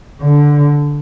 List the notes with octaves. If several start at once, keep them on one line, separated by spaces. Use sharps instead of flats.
D3